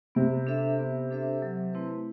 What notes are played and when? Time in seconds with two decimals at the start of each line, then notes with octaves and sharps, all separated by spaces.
0.15 C3 B3
0.47 D4 A4 C5 E5
0.79 B3
1.10 D4 A4 C5 E5
1.42 F#3
1.73 A3 C4 E4 B4